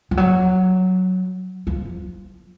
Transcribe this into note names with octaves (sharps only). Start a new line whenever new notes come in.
F3
F#3
F3